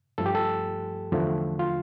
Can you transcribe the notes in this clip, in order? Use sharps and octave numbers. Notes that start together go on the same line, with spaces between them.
G2 F3 A3 A4
G4
A4
E2 D3 F3 A3
F4